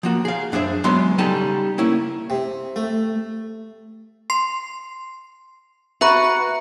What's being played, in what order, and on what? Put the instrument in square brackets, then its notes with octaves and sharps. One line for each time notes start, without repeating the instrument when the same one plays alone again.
[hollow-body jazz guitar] F3 A#3 F#4
G#4 F5
F#2 D4 G#4 C5 E5
F#3 G#3 B3 C6
C#3 G3 D#4 A4 G#5 A5
A#3 C#4 E4
[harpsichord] C3
A3
[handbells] C6 C7
[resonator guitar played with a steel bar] F#4 B4 [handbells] E5 A#5